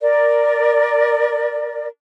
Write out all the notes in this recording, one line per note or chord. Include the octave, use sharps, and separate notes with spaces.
A#4 D5